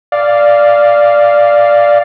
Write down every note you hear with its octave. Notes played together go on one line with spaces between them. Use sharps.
D5 F5